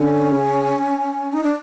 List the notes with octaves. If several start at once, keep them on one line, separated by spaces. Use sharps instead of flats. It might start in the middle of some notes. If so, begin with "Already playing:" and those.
Already playing: D3 C#4
C#3
D#4
D4